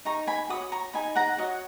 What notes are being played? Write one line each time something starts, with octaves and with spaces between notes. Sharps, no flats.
D#4 A#5 C#6
G#5 B5
F#4 C#5 B5 D#6
A#5 C#6
D#4 G#5 B5
F#5 A#5
F#4 C#5 D#5 F#5